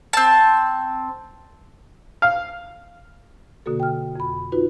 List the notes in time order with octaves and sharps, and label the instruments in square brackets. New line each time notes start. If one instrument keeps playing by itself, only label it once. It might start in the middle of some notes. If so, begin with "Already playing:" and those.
[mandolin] C4 A5
[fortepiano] F5
[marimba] B2 D3 A#3 F#4 A4
G5 F6
F2 B5
D#4 F4 F#4 B4